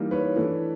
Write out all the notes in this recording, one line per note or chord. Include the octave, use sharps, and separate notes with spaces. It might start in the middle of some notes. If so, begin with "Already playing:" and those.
Already playing: E3 G3 A#3 D#4
B4 C#5
E3 A3 D4